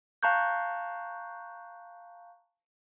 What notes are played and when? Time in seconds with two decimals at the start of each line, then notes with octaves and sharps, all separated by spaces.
0.23 F5 A5 A#5 C#6 F#6 G6